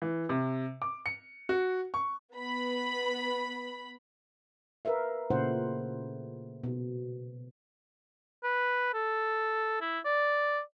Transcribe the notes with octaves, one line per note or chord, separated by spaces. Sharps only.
E3
C3
D6
C#7
F#4
C#6
B3 B5
A#4 B4 E5 F5
A#2 C#3 A3 E4 C5 F#5
B2
B4
A4
E4
D5